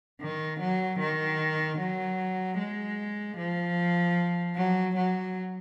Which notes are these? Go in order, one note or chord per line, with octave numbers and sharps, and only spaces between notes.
D#3
F#3
D#3
F#3
G#3
F3
F#3
F#3